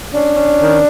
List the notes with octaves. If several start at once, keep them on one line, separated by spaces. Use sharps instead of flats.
C#4 D4
C#4
D#3